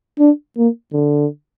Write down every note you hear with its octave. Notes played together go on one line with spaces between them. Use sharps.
D4
A#3
D3